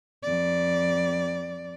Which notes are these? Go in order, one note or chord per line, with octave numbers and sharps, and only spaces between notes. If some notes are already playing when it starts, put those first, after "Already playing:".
F2 D5